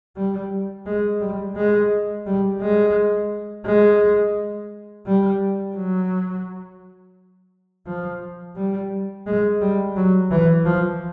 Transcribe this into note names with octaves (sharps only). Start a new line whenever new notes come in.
G3
G#3
G3
G#3
G3
G#3
G#3
G3
F#3
F3
G3
G#3
G3
F#3
E3
F3